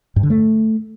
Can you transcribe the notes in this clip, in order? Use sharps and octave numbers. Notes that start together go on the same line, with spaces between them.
G2
D3
A3